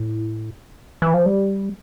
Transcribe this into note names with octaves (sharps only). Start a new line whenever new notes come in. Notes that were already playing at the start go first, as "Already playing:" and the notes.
Already playing: A2
E3
F3
G3